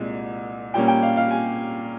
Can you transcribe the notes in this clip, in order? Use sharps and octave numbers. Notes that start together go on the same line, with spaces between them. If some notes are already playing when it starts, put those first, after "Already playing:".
Already playing: C2 A#2 G#3
A#2 G3 A#3 C#4 G5
G5
F5
F5
G#5